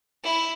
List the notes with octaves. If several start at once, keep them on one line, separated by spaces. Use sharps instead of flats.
E4